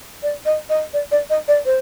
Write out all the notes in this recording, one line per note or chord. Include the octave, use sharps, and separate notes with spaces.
D5
D#5
D#5
D5
D5
D#5
D5
C5